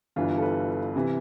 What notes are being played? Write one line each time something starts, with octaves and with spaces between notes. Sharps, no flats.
G1 G2 E3 F4
A4
B4
C3 E3